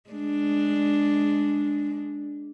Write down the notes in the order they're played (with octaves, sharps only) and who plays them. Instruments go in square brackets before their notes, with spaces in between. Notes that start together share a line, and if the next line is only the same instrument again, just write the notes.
[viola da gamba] G#3 D4